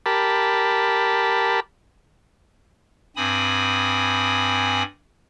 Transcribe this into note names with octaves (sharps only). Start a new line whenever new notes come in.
G4 A#4 A5 B5
G2 C4 G#5 B5 D#6